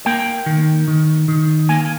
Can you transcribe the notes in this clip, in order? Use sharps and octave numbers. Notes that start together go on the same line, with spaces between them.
A#3 G5
D#3
D#3
D#3
A#3 G#5